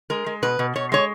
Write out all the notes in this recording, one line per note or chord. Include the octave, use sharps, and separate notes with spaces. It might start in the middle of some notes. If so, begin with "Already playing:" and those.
G#3 A#4
G#3
B2 B4
B2
B2 C#5
G#3 C#5